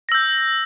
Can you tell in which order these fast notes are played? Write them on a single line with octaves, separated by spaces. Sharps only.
A#6 E6 G6